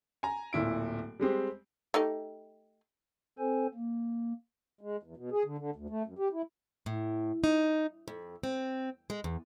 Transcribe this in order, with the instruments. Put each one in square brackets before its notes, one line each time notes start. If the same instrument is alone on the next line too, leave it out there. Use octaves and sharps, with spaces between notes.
[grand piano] G#5 A#5
D1 A#2 E4 D7
G3 G#3 C4 G4
[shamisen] A3 D#4 G4
[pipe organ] C4 A4 C5 G#5
A#3
[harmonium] G#3
E2
B2
G#4
D3
D3
D2
A3
F#2
G4
E4
[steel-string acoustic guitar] A2
D#4
F2
C4
G#3
E2